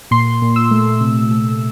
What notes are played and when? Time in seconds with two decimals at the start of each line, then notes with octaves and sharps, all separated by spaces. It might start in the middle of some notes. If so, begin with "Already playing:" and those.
0.11 A#2 C6
0.42 A#2
0.56 E6
0.71 A3
1.01 C3
1.31 A3